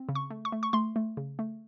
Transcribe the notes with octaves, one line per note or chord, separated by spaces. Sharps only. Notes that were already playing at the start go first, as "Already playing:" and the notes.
Already playing: C4
C#3
C#6
A3
C#6
A3
C#6
A3 C6
A3
C#3
A3